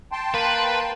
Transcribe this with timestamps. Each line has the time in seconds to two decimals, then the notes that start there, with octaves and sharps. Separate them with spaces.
0.12 G5 A5 C6
0.34 A#3 B4